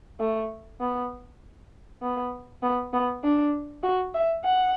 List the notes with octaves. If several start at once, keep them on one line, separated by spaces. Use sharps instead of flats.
A3
B3
B3
B3
B3
D4
F#4
E5
F#5